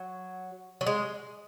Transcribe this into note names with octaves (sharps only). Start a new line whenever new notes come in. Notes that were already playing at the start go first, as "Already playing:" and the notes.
Already playing: F#3
F#3
G#3